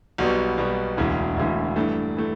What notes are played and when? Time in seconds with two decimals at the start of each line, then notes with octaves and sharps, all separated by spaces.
0.18 B1 B2 G3 B3
0.58 B1 B2 G3 B3
0.97 E1 D2 C#3 E3
1.36 E1 D2 C#3 E3
1.76 G2 E3 A3
2.17 E3 A3